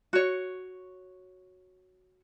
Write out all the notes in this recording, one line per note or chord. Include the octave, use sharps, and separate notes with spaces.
F#4 C#5